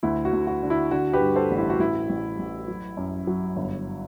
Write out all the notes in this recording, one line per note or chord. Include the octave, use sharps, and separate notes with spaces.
D2 E4
F#4
D2
F#4
D3
E4
D3 F#4
G4 B4
G2
A4 C5
A1
E4
F#4
A1 E4
A1
A1
F#3
F#2
F#3
G1